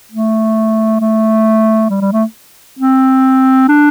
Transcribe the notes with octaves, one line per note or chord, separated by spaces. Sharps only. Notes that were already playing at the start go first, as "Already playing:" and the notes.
A3
A3
G3
G3
A3
C4
D4